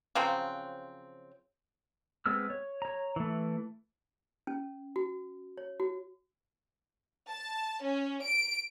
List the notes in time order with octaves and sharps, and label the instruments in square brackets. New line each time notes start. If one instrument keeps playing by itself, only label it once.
[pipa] C#3 F3 F#3 C4
[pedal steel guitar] G#3 B3 C4 E6 F6
C#5
C#5 A#5
E3 A3
[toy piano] C#4
F#4
C#5
F#4
[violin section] A5
C#4
D7